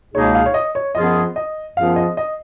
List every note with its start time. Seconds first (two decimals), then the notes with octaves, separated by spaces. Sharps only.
0.14 C#2 B2 A#3 D#4 G#4 C#5
0.35 F5
0.46 C#5
0.54 D#5
0.75 C#5
0.95 F#2 F3 B3 F4 G#4 D#5
1.36 D#5
1.76 F#2 F3 B3 F4 G#4 F5
1.96 D#5
2.17 D#5